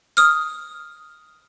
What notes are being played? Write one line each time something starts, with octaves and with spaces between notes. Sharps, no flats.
D#6 F6